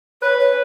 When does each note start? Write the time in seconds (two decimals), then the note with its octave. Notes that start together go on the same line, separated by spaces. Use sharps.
0.22 B4 C#5
0.40 C#5